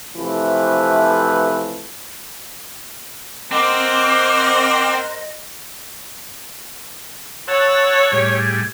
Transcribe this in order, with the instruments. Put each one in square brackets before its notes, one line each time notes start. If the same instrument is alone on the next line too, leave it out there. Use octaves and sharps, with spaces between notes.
[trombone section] C3 E3 F3 A3 B4
[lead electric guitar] C4 [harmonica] A#4 C5 F#5 [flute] D#5 [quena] D6
[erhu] C#5 [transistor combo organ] F#5 A5 E6
[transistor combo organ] A2 G3 G#4